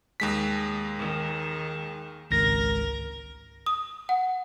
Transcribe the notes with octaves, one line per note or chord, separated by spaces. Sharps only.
D#2 G#3 B6
D#3
G#1 C#2 A#4 A#6
D#6
F#5